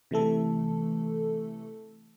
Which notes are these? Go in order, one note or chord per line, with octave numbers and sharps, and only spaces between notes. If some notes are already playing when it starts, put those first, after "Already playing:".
C3 E3 A3 A4